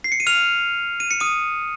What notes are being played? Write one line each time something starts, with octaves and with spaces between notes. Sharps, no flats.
C7
C#7
D#7
F6 F7
D#7
C#7
D#6 D#7